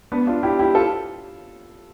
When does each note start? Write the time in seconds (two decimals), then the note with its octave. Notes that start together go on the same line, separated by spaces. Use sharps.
0.12 B3 D4
0.27 D4 F4
0.43 E4 G4
0.59 E4 G4
0.75 F4 A4